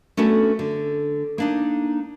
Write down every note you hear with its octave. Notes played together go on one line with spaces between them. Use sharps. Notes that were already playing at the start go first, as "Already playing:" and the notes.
A3 B3 C#4 D4 F#4 A4
D3
A#3 D4 D#4